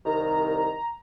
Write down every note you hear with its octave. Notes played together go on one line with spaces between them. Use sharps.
C2 D#3 A#5